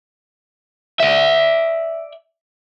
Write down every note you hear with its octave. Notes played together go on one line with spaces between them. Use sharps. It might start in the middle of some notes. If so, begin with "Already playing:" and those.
D5 E5